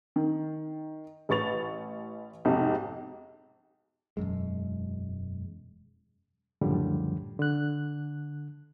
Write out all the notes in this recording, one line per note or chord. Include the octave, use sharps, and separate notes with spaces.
D#3
A1 B4 C#6 A6 F7
B1 F2 G#2 C3
E1 C#2 F#2 G#3
C#2 F#2 A2 D3 F3 G3
D3 F#6